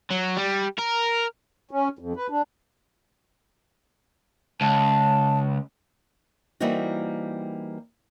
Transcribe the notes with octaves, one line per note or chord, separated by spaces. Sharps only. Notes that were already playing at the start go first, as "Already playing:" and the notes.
F#3
G3
A#4
C#4
F2
B4
D4
C#2 A5
E3 G3 A#3 C4 D#4 F#4